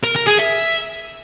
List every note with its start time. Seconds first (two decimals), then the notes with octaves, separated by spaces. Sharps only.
0.04 A#4
0.16 A#4
0.28 G#4
0.39 E5